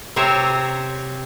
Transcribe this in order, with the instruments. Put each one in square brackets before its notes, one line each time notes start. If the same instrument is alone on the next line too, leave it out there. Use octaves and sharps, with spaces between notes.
[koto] C3 C4 C#5 E5 A#5